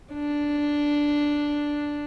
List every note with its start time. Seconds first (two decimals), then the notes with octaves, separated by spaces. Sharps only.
0.13 D4